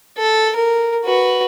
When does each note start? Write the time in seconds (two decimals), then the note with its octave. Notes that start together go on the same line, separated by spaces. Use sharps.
0.17 A4
0.55 A#4
1.05 F#4 B4